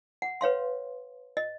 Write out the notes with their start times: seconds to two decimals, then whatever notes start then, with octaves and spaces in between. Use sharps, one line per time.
0.22 F#5
0.41 B4 C#5 F5 C6
1.37 D#5